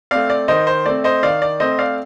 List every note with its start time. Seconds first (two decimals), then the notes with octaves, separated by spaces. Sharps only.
0.11 A3 C4 D5 F5
0.30 D5
0.48 D#3 C5 D#5
0.67 C5
0.86 A3 C4 D5
1.04 C5 D#5
1.23 D#3 D5 F5
1.42 D5
1.60 A3 C4 C5 D#5
1.79 D5 F5